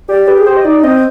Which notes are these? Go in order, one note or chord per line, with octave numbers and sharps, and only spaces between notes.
G4 D5
G4 B4
G#4
G4 C5
D#5
D#4 D5
C4 D#5